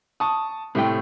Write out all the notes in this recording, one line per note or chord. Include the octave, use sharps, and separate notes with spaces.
A5 C#6 D#6
A2 C3 A3 E5 G5